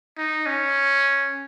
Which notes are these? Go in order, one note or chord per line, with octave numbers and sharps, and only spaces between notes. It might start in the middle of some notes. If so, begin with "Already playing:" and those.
D#4
C#4